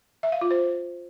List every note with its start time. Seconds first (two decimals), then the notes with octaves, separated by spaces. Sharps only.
0.23 E5
0.32 F5
0.41 F4
0.51 C5